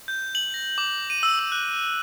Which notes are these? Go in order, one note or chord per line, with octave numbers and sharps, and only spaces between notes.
G6
F#7
A#6
D6
D#7
E6
E6
F#6